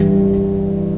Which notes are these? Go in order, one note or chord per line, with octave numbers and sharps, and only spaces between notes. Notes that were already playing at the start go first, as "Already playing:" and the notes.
Already playing: A1 G2 E3 G3